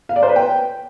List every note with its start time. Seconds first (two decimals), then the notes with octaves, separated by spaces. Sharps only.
0.09 F5
0.16 D5
0.23 C5
0.29 B4
0.36 G5